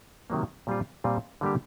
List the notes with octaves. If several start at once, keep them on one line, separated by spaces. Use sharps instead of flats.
C3 D#3 F#3 A#3
A#2 G3 C4 F4
A#2 G3 C4 F4
D3 G3 A#3 D4 G4